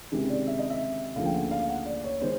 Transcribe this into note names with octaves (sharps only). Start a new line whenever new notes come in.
C#2 C3 D#3 G#3
D5
E5
D#5
E5
D2 C#3 F3 A#3 F5
G5
F#5
F5
F#5
D5
C#5
D#3 G#3 B3 C5